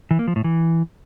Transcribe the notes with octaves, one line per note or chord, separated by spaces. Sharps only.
E3
A#3
F3
A2
E3